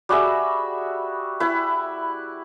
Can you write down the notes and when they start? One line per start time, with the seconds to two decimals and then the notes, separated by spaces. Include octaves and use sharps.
0.09 G3 F#4 G#4 E5
1.40 E4 B4